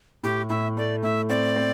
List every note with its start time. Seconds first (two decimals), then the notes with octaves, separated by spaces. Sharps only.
0.23 A2 G4
0.49 A2 E5
0.77 A3 D5
1.03 A2 E5
1.29 C4 D5
1.56 C4